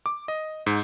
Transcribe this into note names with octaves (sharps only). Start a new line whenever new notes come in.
D6
D#5
G#2